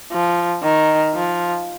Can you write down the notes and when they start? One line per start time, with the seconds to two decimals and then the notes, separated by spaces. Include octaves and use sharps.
0.11 F3
0.63 D#3
1.15 F3